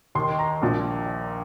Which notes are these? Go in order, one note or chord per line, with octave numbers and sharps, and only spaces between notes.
D#2 D#3 C6
A#5
A#1 A#2 F3